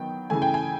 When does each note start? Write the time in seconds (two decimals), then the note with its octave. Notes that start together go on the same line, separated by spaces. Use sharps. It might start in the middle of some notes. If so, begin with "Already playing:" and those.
Already playing: D#3 F#3 B3 G5
0.30 C#3 E3 A3 G#5
0.42 G5
0.54 G#5